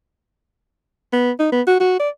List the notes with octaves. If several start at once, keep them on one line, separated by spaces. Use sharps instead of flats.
B3
D#4
B3
F#4
F#4
D5